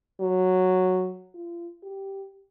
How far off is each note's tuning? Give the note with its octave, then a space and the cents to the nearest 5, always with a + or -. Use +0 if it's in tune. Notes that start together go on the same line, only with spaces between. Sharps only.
F#3 -5
F4 -35
G4 -5